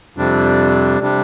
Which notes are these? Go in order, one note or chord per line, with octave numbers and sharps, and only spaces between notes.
F2 C3 G3 D4
C3 G3 D4